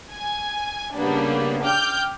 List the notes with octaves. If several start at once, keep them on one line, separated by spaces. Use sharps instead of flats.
G#5
C#3 G3 A#3 B3 D4
G5 D6 F6 G6